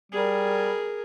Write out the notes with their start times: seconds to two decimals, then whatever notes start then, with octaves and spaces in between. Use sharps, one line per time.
0.12 G3 G#4 A#4